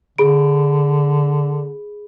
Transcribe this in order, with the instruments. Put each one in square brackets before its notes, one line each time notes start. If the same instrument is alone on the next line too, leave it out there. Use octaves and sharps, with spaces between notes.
[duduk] D3 [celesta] G#4 B5 D7